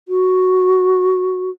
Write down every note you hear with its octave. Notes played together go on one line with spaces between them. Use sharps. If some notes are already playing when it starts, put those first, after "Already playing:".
F#4